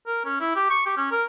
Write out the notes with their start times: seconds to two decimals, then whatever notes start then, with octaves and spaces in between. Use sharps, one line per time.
0.07 A#4
0.25 C#4
0.40 E4
0.56 G4
0.70 C#6
0.86 G4
0.97 C#4
1.12 A#4